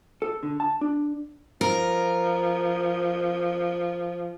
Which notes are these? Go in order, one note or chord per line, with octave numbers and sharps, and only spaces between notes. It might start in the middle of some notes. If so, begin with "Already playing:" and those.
A4
D3
A5
D4
F3 A#4